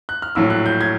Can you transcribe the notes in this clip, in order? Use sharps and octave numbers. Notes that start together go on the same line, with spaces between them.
F#6
F6
A#1 A2 F#3 E6
F#6
G6
G#6